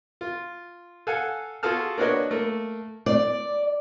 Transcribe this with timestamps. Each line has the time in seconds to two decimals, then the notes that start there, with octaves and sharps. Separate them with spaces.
0.21 F4
1.07 A4 F5 F#5 G#5
1.63 F4 F#4 G#4 A4 A5 F6
1.98 A#3 D4 F#4 B4 C#5 D#5
2.31 A3 A#3
3.06 D5